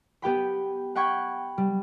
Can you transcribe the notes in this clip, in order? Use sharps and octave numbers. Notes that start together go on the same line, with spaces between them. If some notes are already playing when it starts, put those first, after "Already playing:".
B3 G4 G5 B5
F#5 G5 B5 C#6 G#6
G3